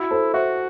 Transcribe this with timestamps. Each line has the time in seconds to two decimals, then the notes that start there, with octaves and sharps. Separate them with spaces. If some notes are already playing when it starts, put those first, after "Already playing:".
Already playing: E4 F#4
0.11 A4 C5
0.34 F#4 C5 E5